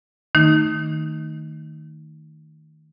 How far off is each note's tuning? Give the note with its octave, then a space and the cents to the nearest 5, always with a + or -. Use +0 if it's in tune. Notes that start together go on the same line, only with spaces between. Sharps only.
D#3 +0 A3 +25 D#4 +0